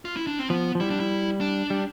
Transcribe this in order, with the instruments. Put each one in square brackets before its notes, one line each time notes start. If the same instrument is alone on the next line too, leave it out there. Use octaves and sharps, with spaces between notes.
[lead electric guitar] F4
E4
D4
C4
[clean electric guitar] F3 [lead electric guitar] B3
[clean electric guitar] F3
[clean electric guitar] G3 [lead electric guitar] E4
[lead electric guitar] D4
E4
D4
[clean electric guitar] G3